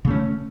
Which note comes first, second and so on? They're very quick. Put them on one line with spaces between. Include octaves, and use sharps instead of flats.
C#3 A3 C#4